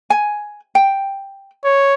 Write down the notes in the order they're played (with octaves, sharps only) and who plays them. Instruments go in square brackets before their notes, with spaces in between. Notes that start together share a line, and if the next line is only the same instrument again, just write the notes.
[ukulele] G#5
G5
[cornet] C#5